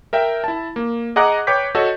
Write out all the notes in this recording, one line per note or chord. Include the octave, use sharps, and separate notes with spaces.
A#4 E5 G5
E4 A5
A#3
G#4 D#5 F#5 A#5 D6 F#6
B4 C#5 G5 D6 G6 B6
F#4 A4 C#5 D#5